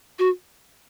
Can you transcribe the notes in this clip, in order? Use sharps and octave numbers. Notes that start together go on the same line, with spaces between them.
F#4